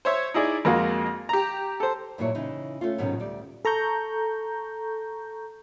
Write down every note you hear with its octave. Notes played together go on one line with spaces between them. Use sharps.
C5 C#5 E5
D#4 E4 G#4 D5
F2 G#3 A#3 F4 F#4
G4 A#5
A4 C5
G2 A#2 F#3 A#3 E4 C#5
C#3 E3 D#4
A3 C#4 F4
G#2 B2 D#3 F#3 C#4
D2 G3 D5
A4 A#5 C#6 G6